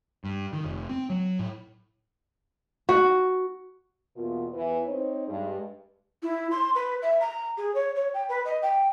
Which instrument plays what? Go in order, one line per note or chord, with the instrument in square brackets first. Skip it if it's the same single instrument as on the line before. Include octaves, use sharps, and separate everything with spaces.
[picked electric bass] G2
D#3
F1
C4
F#3
A2
[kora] F#4
[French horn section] E2 B2 A#3 F4
E2 E3 B4
C4 D#4 C5 C#5
G2 G#3
[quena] E4
C6
B4
E5
A#5
G#4
C#5
C#5
G5
B4
D#5
G5